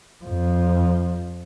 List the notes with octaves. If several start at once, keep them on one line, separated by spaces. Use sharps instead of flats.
F2 F3